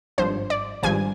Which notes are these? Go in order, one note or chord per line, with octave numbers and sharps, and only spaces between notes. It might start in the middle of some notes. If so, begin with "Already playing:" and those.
G#1 G2 F3 C5
D5
G#1 G2 F3 G#5